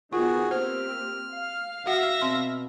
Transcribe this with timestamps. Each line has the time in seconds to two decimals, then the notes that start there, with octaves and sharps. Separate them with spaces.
0.13 D#3 B3 F4 F#4 G#4
0.51 A#3 C4 G4 C5 F6
1.32 F5
1.87 F#4 E5 F#5 A#6
2.22 B2 C4 C6